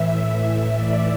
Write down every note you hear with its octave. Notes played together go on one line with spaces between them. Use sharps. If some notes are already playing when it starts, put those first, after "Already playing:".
Already playing: A2 E3 E5
D5